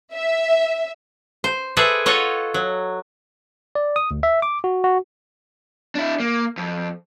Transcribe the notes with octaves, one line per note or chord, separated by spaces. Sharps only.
E5
C5
G#4 A4 B4 C5 D5 E5
F4 A4 C#5 D#5 F#5
F#3
D5
D#6
D2
E5
D6
F#4
F#4
D4 E4
A#3
F2